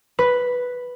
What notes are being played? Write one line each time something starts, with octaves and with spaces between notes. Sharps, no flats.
B4